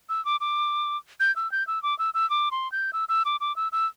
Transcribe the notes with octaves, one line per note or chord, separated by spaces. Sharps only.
E6
D6
D6
G6
E6
G6
E6
D6
E6
E6
D6
C6
G6
E6
E6
D6
D6
E6
E6